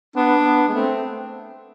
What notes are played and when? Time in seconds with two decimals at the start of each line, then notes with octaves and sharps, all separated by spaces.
0.16 B3 D4
0.46 B3
0.68 G#3
0.74 A3 C4